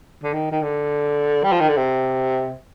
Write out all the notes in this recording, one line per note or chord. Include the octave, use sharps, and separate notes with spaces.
D3
D#3
D#3
D3
G3
F3
D#3
D3
C3